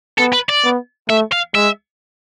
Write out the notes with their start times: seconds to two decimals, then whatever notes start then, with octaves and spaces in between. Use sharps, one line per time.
0.18 B3 A4
0.33 B4
0.49 D5
0.64 B3
1.09 A3 E5
1.32 F5
1.55 G#3 E5